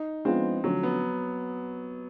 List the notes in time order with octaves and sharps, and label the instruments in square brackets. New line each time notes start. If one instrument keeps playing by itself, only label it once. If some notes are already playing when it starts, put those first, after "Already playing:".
Already playing: [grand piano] D#4
[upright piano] F3 G#3 B3 D4 F4 [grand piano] C4
[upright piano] D3 F3 A3 C#4 F#4 [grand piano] F#3
[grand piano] B3